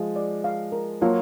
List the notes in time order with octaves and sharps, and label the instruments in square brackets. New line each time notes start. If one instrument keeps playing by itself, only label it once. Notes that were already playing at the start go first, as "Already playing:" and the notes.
Already playing: [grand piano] F3 G#3 [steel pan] F5
[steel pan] D5
F5
A#4
[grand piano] F#3 A#3 [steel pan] F4